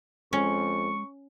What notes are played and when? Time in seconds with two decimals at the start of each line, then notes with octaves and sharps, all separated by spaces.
0.33 F2 G#3 C#4 C#6